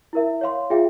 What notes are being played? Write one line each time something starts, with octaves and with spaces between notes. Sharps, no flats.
E4 A#4 E5
C#5 F5 C6
F4 G#4 E5 G5